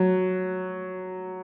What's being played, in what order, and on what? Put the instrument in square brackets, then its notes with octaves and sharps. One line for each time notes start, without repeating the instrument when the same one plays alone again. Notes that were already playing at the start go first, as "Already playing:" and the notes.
Already playing: [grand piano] F#3